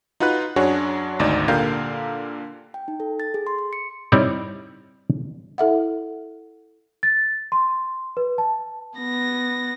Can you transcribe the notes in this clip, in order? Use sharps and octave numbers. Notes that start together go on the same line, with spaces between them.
D#4 F4 F#4 B4 F#6
F#2 F#3 D4 F#4 G#4 C#5
G#1 D2 D#4 D5
A#2 D3 G4 A#4 F5 G6
G5
D#4
A4
A6
G#4
C6
C6
C#7
G3 C4 D#4 E4 C#5 D5
E4 A4 E5 F#5
A6
C6
B4
A5
B3 A#6